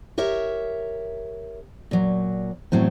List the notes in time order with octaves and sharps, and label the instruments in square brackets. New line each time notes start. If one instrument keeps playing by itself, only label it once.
[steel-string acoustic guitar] G4 A#4 C#5 E5
A#2 F#3
E2 A2 F#3 C4